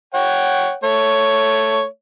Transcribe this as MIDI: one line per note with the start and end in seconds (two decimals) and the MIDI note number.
0.14 0.75 73
0.14 0.75 78
0.14 0.75 79
0.84 1.85 57
0.84 1.85 73